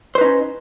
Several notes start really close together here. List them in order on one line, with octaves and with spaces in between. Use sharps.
C5 B4 D#4 C#4